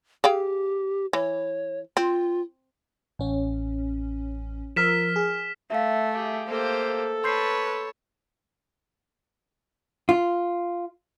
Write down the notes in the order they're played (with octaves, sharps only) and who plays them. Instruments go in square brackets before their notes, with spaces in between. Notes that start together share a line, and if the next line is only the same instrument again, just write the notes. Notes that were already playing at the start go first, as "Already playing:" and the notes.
[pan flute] G4 [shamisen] G#4 F5 G5
[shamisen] E3 [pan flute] C#5
[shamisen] C4 [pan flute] F4
[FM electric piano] A1 C#4
[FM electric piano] F3 A#4 E6 [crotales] F6 B6 E7
[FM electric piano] G#4
[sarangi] A3 [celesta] E5 F5
[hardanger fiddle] G4 G#4
[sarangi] A#3 [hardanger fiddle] G4 C5 [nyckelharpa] A4
[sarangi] B4 [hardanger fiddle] C#5 A5 [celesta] C6 G6 C7
[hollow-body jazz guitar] F4